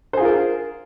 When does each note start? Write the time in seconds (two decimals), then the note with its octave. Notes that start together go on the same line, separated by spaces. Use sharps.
0.13 C5
0.17 G#4
0.21 F4
0.25 A#4